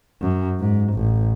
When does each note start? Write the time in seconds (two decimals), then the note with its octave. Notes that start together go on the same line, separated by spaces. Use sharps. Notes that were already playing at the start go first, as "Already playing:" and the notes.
0.21 F#2
0.60 G#2
0.94 A1